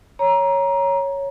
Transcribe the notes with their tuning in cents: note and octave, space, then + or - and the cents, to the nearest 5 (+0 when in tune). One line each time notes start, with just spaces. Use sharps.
C#5 +0 A#5 +20